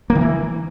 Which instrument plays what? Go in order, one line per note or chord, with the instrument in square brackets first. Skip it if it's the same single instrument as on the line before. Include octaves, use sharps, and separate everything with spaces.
[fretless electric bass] A#3
D#3
E3